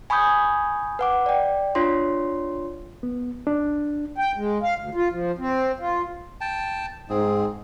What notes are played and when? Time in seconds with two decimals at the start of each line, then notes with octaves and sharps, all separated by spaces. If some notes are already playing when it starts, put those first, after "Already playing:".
0.10 G#5 B5 C#6 D#6 G6 G#6
0.99 B4 F#5 D6
1.26 D5 G5
1.75 D4 F4 C#5 C6
3.03 B3
3.47 D4
4.18 G5
4.37 G#3
4.63 F5
4.78 D2
4.95 F4
5.12 F3
5.38 C4
5.80 F4
6.41 G5 A5
7.10 G#2 C4 G#4